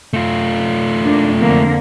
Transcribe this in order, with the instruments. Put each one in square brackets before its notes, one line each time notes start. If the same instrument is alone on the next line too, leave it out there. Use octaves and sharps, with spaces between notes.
[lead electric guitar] A3 F4
[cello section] A#3 D4
F2 D3 A#3